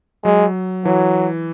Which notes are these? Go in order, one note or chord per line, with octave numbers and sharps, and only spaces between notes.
F#3 G#3
E3 F#3